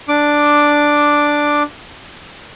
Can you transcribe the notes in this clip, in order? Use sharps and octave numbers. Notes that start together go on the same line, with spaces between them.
D4 D6